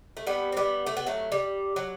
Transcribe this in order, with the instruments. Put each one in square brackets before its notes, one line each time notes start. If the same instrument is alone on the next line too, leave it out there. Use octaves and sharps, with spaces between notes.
[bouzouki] A3
G3 B3
C4
G3 B3
A3
B3
F#3 A3
G3
F#3